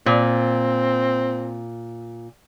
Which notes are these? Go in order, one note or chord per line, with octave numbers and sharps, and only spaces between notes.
A#2 C4